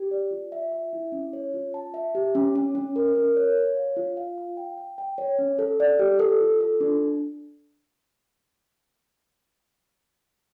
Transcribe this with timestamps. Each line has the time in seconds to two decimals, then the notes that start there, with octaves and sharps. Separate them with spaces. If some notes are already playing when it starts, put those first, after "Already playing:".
Already playing: G4
0.11 D5
0.31 F4
0.52 E5
0.72 E5
0.93 E4
1.12 C#4
1.33 C#5
1.54 F4
1.74 A5
1.94 E5
2.15 G4
2.35 C#4
2.55 C#4
2.75 C#4
2.96 A#4
3.15 A#4
3.37 C#5
3.57 C#5
3.77 F5
3.96 F4
4.17 F5
4.38 F5
4.57 G5
4.78 G5
4.98 G5
5.18 C#5
5.39 C#4
5.59 A4
5.80 D5
5.99 G4
6.19 A4
6.41 F4
6.61 A4
6.81 D4